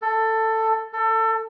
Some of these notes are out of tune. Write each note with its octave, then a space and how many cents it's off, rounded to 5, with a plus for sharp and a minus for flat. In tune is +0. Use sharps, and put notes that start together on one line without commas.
A4 +15
A4 +25